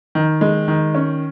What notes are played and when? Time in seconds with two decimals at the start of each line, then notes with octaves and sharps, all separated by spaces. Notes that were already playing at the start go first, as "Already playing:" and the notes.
0.15 D#3
0.41 G#3
0.68 D#3
0.95 C#4